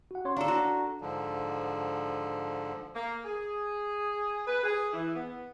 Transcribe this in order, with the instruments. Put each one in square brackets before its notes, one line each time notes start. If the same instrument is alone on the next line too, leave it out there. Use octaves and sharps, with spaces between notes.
[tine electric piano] F#4 F#5
C#4 C#5 C6
[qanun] D4 A4 [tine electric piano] F5 A#5
[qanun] F#4 [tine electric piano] A#5
[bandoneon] G#2 D3 F3
[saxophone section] A#3
G#4
B4
G#4
E3
B3